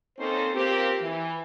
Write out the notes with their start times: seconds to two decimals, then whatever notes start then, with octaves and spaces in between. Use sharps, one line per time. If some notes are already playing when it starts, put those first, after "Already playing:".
0.19 A#3 C4 C#4 D#4 A4 C5
0.54 A#3 C4 F4 G4
1.00 E3